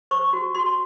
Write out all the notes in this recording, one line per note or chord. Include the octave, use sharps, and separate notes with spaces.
C5 C#6
F#4
F#4 C6